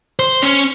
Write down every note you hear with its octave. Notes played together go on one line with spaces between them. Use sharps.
C5
C#4